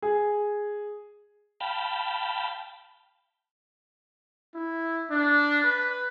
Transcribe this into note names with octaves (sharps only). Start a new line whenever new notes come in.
G#4
F5 G5 A5 B5
E4
D4
B4